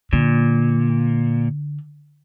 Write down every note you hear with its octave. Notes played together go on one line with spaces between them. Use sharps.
A#2 D3